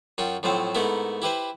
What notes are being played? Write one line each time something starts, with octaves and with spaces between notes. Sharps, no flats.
F#2 F4 F#4 G5
A2 F3 F#3 C4 C5
G#2 A3 B3 E4 A#4
E4 G4 B4 C5